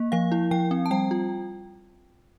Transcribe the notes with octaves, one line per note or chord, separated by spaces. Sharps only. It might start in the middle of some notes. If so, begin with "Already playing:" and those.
Already playing: A#3
F3 F5
E4
F3 G5
C4
A5
G3 G5
F4